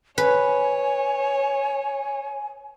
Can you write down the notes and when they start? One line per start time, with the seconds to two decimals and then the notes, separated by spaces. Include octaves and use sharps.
0.18 B4 C#5 G#5